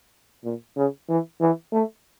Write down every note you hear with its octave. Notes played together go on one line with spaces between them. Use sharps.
A#2
C#3
E3
E3
A3